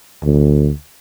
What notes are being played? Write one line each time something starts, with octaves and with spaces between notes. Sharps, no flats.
D2